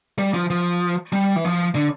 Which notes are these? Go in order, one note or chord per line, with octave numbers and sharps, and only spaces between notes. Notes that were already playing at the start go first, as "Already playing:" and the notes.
G3
F3
F3
G3
E3
F3
D3